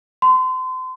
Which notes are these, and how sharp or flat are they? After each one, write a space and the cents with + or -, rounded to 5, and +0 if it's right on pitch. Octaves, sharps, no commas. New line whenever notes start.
C6 -35